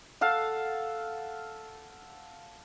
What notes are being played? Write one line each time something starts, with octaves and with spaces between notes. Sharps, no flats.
A4 F5 F#5